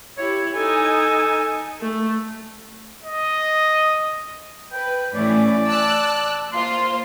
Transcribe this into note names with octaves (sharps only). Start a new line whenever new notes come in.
E4 G4 C#5
D#4 A4 G#5
A3
D#5
B4 G5
A2 E3 C#4 D5
A5 E6 F#6
A#3 F4 C5 C6